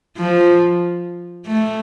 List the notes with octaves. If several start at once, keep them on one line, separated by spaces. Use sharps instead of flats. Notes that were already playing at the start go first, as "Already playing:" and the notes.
F3
A3